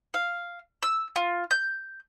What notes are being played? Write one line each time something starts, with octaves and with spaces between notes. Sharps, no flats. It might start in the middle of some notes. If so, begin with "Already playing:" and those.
F5
E6
F4
G6